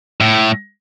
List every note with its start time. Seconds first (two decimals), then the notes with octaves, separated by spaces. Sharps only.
0.21 A2